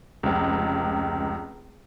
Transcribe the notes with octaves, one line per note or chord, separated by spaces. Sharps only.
F1 C#2